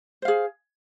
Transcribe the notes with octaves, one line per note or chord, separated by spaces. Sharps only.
G#4 C5 F5